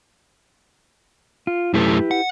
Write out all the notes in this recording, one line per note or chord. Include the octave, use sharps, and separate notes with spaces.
F4
F#2 A3 E4 G4 B4
F#5